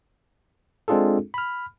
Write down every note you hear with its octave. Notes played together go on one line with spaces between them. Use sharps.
G#3 C4 D4 F4 G#4 A4
B5 F6